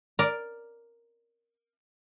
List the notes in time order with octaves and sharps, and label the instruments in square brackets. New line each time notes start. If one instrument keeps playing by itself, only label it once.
[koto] A#4 D5